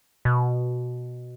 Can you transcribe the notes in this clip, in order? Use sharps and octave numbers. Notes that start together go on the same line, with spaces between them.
B2